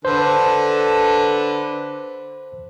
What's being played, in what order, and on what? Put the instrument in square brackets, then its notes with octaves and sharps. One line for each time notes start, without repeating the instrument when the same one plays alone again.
[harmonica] D3 A4 B4 [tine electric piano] C5